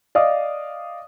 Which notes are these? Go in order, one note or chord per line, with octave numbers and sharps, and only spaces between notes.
D5 D#5 F5 D#6